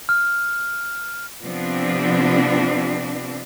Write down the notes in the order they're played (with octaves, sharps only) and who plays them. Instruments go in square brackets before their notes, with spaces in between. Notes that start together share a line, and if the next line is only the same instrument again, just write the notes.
[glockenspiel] F6
[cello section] C3 F3 B3 C4 D4